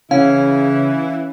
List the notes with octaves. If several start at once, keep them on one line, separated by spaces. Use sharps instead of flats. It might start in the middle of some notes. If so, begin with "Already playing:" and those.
C#3 E3 C#4 E4 F5